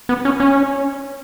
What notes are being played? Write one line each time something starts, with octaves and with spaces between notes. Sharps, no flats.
B3
C#4
C#4